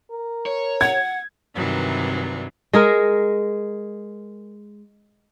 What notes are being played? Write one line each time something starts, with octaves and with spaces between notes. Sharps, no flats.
A#4
C#5
F#5 G#6
G2 C3 D#3 E3 F#3 G3
G#3 G#4 A#4